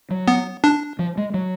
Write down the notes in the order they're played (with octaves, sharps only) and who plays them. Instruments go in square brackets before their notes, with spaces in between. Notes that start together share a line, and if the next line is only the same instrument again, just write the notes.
[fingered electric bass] F#3
[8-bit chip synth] B3
D4
[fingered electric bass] F3
G#3
F#3